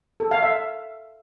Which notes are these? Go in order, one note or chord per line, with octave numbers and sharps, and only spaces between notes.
A4
F5
E5